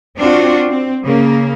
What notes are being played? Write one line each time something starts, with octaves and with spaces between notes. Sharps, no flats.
C4 D4 F4 F#4
C4
C#3 A#3